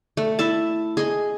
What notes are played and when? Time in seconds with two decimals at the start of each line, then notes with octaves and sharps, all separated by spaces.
0.17 A3
0.39 E4 E5 A5
0.97 G#4 D#5